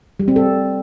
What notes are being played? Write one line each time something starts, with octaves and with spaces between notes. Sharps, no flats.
G3
C4
A4